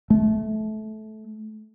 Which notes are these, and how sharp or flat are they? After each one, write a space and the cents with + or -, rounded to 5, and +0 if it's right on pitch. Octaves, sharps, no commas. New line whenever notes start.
A3 -20